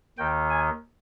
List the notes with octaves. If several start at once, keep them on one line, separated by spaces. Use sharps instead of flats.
D#2 D#3 G5
G#5